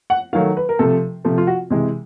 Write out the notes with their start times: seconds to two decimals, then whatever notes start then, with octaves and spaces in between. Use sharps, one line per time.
0.10 F#5
0.33 D#3 F#3 A3 F5
0.57 B4
0.69 A#4
0.79 C3 F3 A3 A4
1.25 C3 F3 A3
1.38 F4
1.47 F#4
1.70 C3 E3 G#3